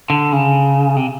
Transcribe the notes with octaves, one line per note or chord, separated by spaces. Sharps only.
D3
C#3
C3